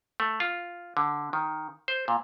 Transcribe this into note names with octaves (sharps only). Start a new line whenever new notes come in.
A3
F4
D3
D#3
C5
A#2